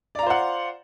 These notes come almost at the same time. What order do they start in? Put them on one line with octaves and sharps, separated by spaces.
D5 A#5 F4 C5 F#5